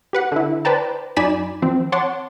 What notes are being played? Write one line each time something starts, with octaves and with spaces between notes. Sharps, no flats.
G4 B4 F#5
D3 E4
B4 C5 D5 G5 A5 A#5
F#2 D#4 D5 G#5 B5 E7
E3 F3 C4
C#5 F#5 A5 C6 D6